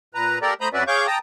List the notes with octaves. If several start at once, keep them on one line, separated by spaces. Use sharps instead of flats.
A#2 B4 A#5
A#3 G4 A4 A#4 D5 A#5
A3 C5 A#5 B5 D#6 G6
F2 C#4 F#4 B4 D5 E5
G#4 C#5 F5 C#6 D6 G6
G5 A5 A#5 D#6